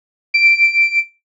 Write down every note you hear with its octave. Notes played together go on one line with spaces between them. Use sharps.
D7